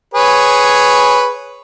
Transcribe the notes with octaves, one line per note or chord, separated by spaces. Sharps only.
G#4 B4 C#5